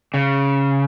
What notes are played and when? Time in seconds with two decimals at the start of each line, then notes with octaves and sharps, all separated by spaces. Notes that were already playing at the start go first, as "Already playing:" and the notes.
0.14 C#3